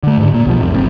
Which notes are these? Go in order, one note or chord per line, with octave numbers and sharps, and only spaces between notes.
D3 A3
G#2 D3
A#2 A#3
C2 B2 F3
C2 F2 C3
G1 F#2 A2 C4